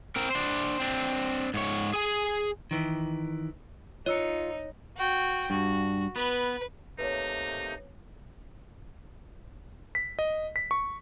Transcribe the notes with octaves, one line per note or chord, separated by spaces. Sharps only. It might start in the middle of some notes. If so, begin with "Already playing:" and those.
C4 A#4
D4 C5
C4 D4
G#2 C#5
G#4 G#5
D#3 E3
D#4 F4 C#5 D#5 E6 C#7
F#4 G5
G2 F#4
B3 B4
C3 A3 A#3 D#4 B4 C#5
B6
D#5
B6
C#6